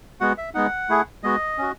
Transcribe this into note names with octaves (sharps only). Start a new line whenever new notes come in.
G#3 B3 F#4 F#5
E5
G#3 B3 D#4 F#5
A3 E4 G#4
G#3 B3 F#4 D#5
C#4 F#4